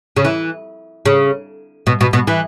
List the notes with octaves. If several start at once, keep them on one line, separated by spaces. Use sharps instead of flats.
C#3
E3
C#3
B2
B2
B2
E3